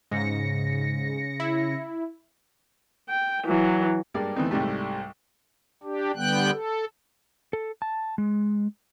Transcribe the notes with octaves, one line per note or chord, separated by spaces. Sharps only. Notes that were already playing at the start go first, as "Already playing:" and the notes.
G#2 C#3 A#6 C#7
E4
G5
E3 F#3
G2 G3 G#3 A#3 D5
E3 A3 B3 C4 D#4
C2 G#2 G3 A3
D4 G4
D3 G3 B3 G5 F#6
A4
A4
A5
G#3